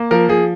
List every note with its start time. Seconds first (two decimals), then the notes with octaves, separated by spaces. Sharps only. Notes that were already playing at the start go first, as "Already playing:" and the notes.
Already playing: A#3
0.11 F3 A#4
0.28 F3 G#4